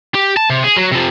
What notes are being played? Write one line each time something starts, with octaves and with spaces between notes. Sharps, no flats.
G4
A5
C3
G#4
F#3
C3 F3